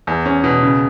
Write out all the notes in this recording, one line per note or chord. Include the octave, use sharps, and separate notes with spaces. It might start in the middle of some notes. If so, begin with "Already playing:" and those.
E2
C#4
B2
C#3